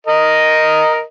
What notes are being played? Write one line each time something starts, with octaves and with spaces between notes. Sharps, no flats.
A#4 D#5